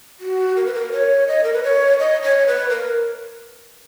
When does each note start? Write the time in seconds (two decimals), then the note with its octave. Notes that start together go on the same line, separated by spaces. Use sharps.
0.21 F#4
0.56 A#4
0.66 B4
0.74 A#4
0.92 C#5
1.28 D#5
1.44 A#4
1.53 B4
1.63 C#5
1.99 D#5
2.22 C#5
2.47 B4
2.70 A#4